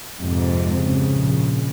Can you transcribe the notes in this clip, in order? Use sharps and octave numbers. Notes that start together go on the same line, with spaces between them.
F2 G#2 C3
C#3
A#1